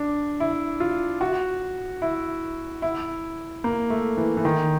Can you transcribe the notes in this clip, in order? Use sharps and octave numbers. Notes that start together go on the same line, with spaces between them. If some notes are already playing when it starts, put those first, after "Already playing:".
Already playing: D4
E4
F4
F#4
E4
E4
A#3
A3
E3
E3
D#3